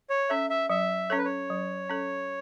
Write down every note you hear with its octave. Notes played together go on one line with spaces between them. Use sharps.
C#5
C#4 A4 E5
E5
F#3 E5
C#4 A4 C#5
B4
C#5
F#3
C#4 A4